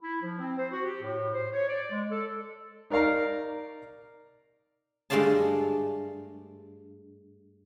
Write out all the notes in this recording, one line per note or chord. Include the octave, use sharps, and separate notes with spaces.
E4
F3
C4
C5
F#4
G4
A2
C5
C#5
D5
G#3
A4
D#4 A#4 D5 F5 A#5
G2 G#3 A3 D5 F5 A5